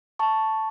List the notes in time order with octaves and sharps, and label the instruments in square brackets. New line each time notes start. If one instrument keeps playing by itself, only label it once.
[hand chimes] A5 C#6